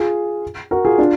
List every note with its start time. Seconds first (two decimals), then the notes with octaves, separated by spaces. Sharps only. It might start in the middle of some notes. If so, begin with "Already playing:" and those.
Already playing: F4 G#4
0.71 F#4 A#4
0.85 F4 G#4
0.98 D4 F4